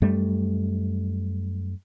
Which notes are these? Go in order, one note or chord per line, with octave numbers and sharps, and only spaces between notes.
F#2 G3 A3